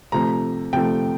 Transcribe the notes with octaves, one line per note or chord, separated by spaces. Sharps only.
C3 F3 A3 A#5
C3 F3 A3 G5